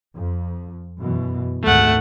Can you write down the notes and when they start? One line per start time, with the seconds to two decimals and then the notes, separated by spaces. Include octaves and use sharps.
0.16 F2
0.98 F#2 B2 E3
1.64 G#1 D2 A3 F#5